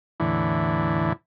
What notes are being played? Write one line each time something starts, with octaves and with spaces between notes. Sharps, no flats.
E2 A2 D3 E3